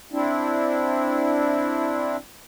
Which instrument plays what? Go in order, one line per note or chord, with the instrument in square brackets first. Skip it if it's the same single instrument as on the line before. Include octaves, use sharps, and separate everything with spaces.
[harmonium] C4 D4 E4